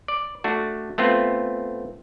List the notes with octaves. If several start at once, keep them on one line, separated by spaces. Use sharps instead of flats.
D5
A3 D4 F#4
A3 B3 C4 F4